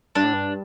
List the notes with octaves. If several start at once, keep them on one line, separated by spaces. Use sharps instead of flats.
G2 D4
A2
G2